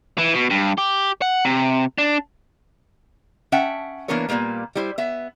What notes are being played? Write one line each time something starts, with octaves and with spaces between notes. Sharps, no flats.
E3
B2
G2
G4
F#5
C3
D4
C#4 E5 F#5 G5 A5
E3 A#3 B3 D4 A#4 C#5
A#2 E3 G3 A#3 B3
G3 E4 C5
B3 E5